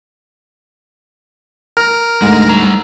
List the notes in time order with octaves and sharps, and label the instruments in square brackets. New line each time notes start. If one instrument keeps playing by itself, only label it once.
[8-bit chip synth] A#4 [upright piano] F6
[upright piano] D2 G#2 [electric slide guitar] G#3
[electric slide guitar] G3 A#5